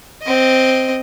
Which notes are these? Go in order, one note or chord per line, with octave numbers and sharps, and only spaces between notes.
C4 D#5